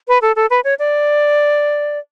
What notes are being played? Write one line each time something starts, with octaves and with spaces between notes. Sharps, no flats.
B4
A4
A4
B4
C#5
D5